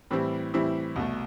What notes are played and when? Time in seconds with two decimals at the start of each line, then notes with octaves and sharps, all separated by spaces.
0.11 A2 E3 G3 C4 E4
0.54 A2 E3 G3 C4 E4
0.96 C2 B2 A3